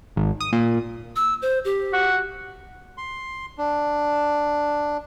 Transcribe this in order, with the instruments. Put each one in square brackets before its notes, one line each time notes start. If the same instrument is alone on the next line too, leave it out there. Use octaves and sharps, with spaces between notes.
[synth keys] G#1
D#6
A#2
[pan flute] E6
C5
G4
[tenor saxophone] F#4
[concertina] C6
D4